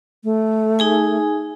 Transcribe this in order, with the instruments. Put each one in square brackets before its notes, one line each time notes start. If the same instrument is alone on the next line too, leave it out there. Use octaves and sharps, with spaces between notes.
[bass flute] A3
[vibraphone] D#4 G#4 G#5